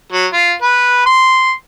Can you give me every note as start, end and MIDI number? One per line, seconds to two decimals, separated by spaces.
0.12 0.26 54
0.33 0.53 65
0.62 1.05 71
1.06 1.52 84